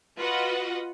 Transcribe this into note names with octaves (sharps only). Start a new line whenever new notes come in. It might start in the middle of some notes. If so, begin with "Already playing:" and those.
F4 F#4 B4 D#5 F#5